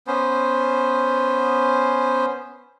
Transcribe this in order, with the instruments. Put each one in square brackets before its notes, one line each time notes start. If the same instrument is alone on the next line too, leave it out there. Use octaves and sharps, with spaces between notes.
[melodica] B3 C#4 C5